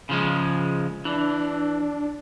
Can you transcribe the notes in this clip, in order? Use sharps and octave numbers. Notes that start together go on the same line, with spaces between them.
C#3 F3 G#3
E3 D4